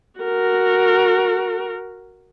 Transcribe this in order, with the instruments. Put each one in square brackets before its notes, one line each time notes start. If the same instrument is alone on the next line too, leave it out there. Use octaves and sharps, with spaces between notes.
[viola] F#4 A#4